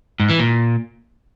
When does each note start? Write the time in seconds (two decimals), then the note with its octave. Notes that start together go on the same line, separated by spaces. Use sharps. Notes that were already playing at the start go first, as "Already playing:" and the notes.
0.20 G#2
0.30 E3
0.39 A#2